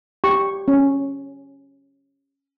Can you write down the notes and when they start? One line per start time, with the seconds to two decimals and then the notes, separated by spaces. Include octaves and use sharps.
0.24 G4 C#6
0.68 C#4